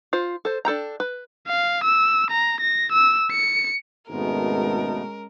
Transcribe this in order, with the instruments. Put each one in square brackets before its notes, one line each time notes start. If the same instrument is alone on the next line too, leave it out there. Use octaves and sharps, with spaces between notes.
[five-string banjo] F4 C5
A4 C5
D4 A4 G5 A#5
B4
[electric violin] F5
E6
A#5
A#6
E6
C#7
[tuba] G#1 [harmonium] B2 A3 B3 [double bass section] G#3 C#4 [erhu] A#4